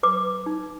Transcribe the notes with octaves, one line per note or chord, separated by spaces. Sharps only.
B4 D6
D#4